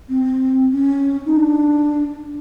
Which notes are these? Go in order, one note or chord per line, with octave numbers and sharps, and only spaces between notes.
C4
C#4
D#4
D4